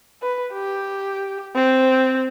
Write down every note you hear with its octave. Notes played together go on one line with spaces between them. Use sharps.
B4
G4
C4